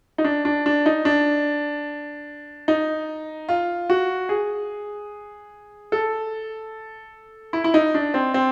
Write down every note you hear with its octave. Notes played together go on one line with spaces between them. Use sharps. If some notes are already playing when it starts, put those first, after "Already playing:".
D#4
D4
D4
D4
D#4
D4
D#4
F4
F#4
G#4
A4
E4
E4
D#4
D4
C4
C4